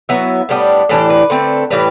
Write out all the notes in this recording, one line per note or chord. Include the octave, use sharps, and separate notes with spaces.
F#3 B3 E4 E5
A2 G3 B3 D4
A2 E3 G3 D4 A4
B4
D3 A3 C4
A2 E3 G3 B4